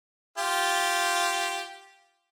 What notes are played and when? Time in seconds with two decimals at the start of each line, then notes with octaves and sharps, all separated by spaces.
0.38 F4 G4